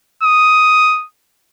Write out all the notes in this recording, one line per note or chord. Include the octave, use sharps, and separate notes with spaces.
D#6